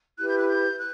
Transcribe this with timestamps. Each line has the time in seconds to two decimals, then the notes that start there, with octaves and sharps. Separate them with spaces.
0.17 E4 G4 B4 F#6
0.28 G6
0.38 F#6
0.48 G6
0.78 F#6